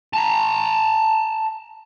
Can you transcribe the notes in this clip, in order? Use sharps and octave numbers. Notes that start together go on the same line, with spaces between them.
A5 A#5